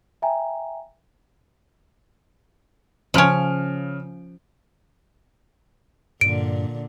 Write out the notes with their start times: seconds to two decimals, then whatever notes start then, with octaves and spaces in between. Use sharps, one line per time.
0.22 E5 G5 G#5 A#5
3.14 C#3 F3 C#4 F6 D7
6.21 G2 A#2 D3 D7